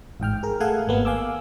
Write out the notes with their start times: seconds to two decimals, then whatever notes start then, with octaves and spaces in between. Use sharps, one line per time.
0.20 A1 G#2 G5 F6
0.43 G#4 A#4
0.60 A3 G#4 A4 F5 F#5 G#5
0.88 G#1 A#3 B3
1.05 F5 G#5 D6 E6